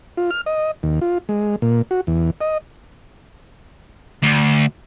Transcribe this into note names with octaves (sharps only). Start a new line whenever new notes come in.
F4
F6
D#5
D#2
F4
G#3
A#2
F#4
E2
D#5
D2